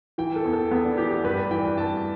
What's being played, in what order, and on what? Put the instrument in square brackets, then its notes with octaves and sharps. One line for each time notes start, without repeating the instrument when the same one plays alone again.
[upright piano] E3 G5
A4
E2
A4
E2 B3
D4
E3 G4
G4
G2 B4
D5
E3 G5
G5
G2 A5